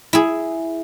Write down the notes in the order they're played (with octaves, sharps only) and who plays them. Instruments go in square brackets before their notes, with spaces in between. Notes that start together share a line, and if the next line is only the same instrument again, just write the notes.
[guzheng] E4 G#4